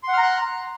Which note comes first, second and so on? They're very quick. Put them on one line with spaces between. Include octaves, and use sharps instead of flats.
C6 F#5 F6 A#5 F#6